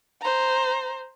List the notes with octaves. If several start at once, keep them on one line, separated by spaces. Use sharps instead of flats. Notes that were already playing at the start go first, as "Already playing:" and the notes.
C5 A#5